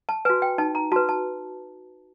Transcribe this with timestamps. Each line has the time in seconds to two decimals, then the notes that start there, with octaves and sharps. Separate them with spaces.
0.09 A5
0.25 F#4 B4 G#5
0.42 G5
0.58 D#4 A5
0.75 A#5
0.92 F#4 A5
0.96 B4
1.09 A5